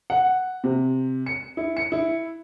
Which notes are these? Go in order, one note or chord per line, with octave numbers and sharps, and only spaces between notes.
F#5
C3
C#7
E4
C#7
E4